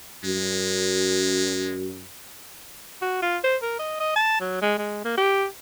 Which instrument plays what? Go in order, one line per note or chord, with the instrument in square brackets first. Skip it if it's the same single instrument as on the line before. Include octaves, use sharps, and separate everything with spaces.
[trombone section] F#2 [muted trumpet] G#3
[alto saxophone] F#4
F4
C5
A#4
D#5
D#5
A5
F#3
G#3
G#3
A#3
G4